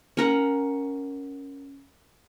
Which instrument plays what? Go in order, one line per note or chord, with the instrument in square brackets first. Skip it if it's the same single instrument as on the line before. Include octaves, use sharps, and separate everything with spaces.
[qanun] C#4 A#4 F#5